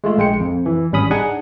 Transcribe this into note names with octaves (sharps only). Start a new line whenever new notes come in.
G#3 A3 F4
A#1 G#3 G5 C#7
F2
E3
G#1 G3 C#4 B5 D#6
D4 D#4 G#4 F#5 G#5